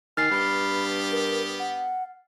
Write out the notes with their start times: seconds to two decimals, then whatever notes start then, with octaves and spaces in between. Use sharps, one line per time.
0.17 D#3 G#5 F6 A6 C7
0.31 G2 B3 G4 B5
1.11 A#4
1.59 F#5